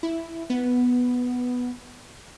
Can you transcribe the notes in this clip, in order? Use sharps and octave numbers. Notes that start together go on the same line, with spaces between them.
E4
B3